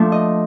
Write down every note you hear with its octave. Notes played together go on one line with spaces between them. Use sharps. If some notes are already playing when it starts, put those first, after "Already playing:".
Already playing: F3 A3 D4
D#5